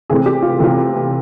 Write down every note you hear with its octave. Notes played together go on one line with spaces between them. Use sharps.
C3 E3 A3 C4 G#4
G4
F4
C3 E3 A3 C4 F4